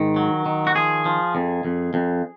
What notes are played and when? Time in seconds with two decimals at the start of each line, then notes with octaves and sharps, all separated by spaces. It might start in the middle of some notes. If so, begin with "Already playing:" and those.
Already playing: G#2 D#3
0.16 F#3
0.46 D#3
0.67 F#4
0.76 F3 G#4
1.05 F3
1.35 F2
1.65 F2
1.94 F2